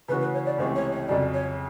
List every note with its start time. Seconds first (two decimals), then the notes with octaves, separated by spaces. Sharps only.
0.08 C#3 E3 A3 C#4 F#4 B4
0.21 B4
0.34 C#5
0.46 D5
0.58 C#2 C3 E3 A3 C#4 C5
0.76 C#5
0.92 C#5
1.08 F2 C#3 F#3 D5
1.34 C#5